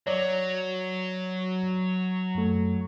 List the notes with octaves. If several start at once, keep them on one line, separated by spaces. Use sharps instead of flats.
F#3 C#5 D5
F#2 A3